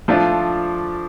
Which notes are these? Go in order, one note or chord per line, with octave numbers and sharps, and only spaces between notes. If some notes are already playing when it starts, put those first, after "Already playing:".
F3 A3 D4 F4